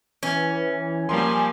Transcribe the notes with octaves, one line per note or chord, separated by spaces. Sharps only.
E3 C#4
F3 G3 A#3 A#4 G#5 C6